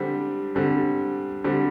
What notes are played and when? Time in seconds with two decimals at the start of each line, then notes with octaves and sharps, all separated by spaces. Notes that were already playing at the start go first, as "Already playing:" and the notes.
Already playing: D3 G3 C4
0.55 D3 G3 C4
1.44 D3 G3 C4